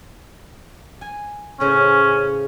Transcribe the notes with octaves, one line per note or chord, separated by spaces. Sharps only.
G#5
A2 C#3 C#4 C5